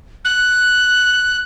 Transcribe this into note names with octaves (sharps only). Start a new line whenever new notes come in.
F#6